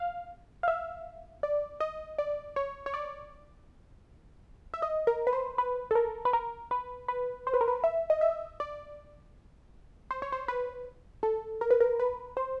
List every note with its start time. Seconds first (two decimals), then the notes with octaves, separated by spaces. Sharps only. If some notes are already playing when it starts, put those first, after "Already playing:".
Already playing: F5
0.63 F5
0.68 E5
1.43 D5
1.80 D#5
2.18 D5
2.56 C#5
2.86 C#5
2.94 D5
4.74 E5
4.82 D#5
5.07 A#4
5.27 B4
5.33 C5
5.58 B4
5.91 A4
5.95 A#4
6.25 B4
6.33 A#4
6.71 B4
7.08 B4
7.47 C5
7.54 B4
7.61 A#4
7.68 B4
7.84 E5
8.10 D#5
8.21 E5
8.60 D5
10.11 C5
10.22 C#5
10.32 C5
10.48 B4
11.23 A4
11.61 A#4
11.70 B4
11.80 A#4
11.99 B4
12.37 C5